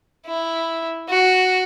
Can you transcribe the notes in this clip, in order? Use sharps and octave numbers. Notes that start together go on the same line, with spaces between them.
E4
F#4